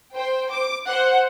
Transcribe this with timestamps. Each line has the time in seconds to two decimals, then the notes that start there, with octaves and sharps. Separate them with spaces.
0.14 C5 G5
0.50 D6
0.85 C5 F#5